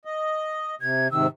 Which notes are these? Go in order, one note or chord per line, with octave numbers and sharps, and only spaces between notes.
D#5
C3 G#6
G#2 C3 D#3 E6